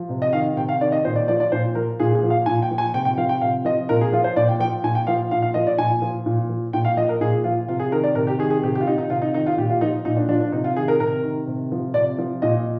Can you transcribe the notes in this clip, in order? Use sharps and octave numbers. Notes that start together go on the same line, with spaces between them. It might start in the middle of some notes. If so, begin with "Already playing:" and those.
Already playing: F3
C3
D#5
D#3 F5
C3 G5
F5
D#3 D5
D#5
A#2 C5
D5
F3 D5
D5
A#2 C5
F3 A#4
A#2 G#4
G#4
F3
F5
A#2 G#5
G5
F3
G#5
C3 G5
G5
F3 F5
G5
C3 F5
F3 D#5
A#2 A#4
G#4
F3 F4
C5
A#2 D5
G5
F3 G5
A#2 G#5
G5
F3 F5
A#2 F5
F5
F3 D#5
D5
A#2 G#5
F3
A#2
F3
A#2 G5
F5
F3 D#5
A#4
A#2 G#4
F3 F4
C3 F4
G#4
D#3 A#4
D5
C3 A#4
G4
D#3 G#4
G#4
C3 G4
G4
F4
D#3 D#4
D#4
C3 F4
D#4
D#3 D#4
F4
A#2 G4
F4
F3 D#4
A#2 D#4
D4
F3 D4
D4
C3 D#4
F4
D#3 G#4
A#4
C3 A#4
D#3
C3
F3
C3 D5
F3
A#2 D#5